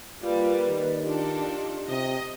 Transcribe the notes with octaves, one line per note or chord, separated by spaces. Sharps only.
G3 A#3 F4 B4 D5
D#3
D4 D#4 F4 G4 A4
C3 D#5